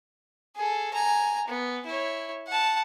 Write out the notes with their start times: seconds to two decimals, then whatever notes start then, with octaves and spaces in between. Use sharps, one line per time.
0.56 G#4 A4
0.93 G#5 A#5
1.48 B3
1.86 E4 C#5
2.47 F#5 A5